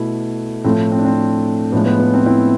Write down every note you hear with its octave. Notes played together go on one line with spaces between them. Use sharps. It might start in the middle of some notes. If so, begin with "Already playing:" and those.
Already playing: B2 A3 E4
A2 F3 A3 C4 E4
C4
D4
C4
A2 F3 G#3 B3 D4
B3
B3
C4
C4 E4